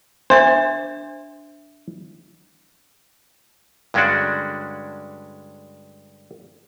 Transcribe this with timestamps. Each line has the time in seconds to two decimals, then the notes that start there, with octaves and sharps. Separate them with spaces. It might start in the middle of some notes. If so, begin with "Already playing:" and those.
0.30 D4 C5 E5
3.94 G2 D3 G#3 C#4 D4 F#4